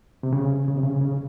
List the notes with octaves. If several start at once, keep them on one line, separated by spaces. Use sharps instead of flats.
C3
C#3
C#3
C3
C#3
C#3